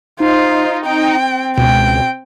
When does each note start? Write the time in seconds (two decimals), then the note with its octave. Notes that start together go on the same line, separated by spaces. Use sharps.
0.20 D#4 F4 C5
0.86 C4 G5
1.58 C#2 B2 G5